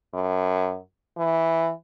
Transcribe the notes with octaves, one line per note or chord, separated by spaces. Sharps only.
F#2
E3